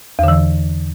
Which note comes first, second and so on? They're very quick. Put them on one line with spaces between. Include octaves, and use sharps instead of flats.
E2 D3 E3